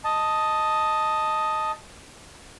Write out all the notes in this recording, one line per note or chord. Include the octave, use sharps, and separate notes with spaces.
D#5 A5